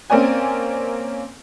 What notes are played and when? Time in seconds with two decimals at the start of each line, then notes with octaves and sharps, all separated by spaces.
0.10 A#3 C4 C#4 D5 G#5